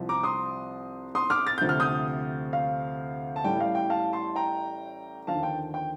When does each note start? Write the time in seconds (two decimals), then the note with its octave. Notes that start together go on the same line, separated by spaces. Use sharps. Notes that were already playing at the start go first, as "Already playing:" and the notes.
Already playing: C2 C3 F3
0.09 A#5 D6
0.23 C6 D#6
1.15 C6 D#6
1.30 D6 F6
1.47 A6
1.58 D2 C3 F3 G6
1.69 F6
1.80 D#6 G6
2.53 F5
3.36 A5
3.45 A1 A2 G3 G5
3.60 F5
3.75 G5
3.90 F5 A5
4.13 A5 C6
4.36 G5 A#5
5.27 D#2 D3 F3 F5 A5
5.43 G5
5.74 G5